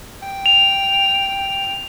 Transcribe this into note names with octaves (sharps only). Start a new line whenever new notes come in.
G5
F7